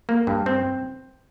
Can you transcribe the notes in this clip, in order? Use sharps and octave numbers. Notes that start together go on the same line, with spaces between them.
A#3
G2
C4